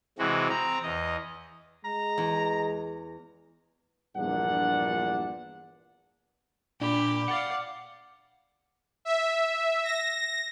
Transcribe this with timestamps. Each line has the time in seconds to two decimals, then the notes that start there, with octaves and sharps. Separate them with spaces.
0.19 C3 E3 G#3 F#4
0.50 C4 A#5
0.83 E2 D#5
1.85 G#3 A#5
2.18 E2
4.16 A#1 E2 G2 A#2 D4 F#5
6.81 A#2 D4 G4 B5
7.28 D5 F5 F#5 A6 C#7
9.05 E5
9.84 A#6